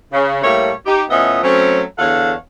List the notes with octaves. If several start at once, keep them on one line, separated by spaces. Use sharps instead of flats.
C#3
A2 G3 A3 A#3 C#5
D#4 G4
A2 F3 B3 C#4 D#5 E5
F#3 A3 C4 C#4
E2 D3 A4 C#5 F5 F#5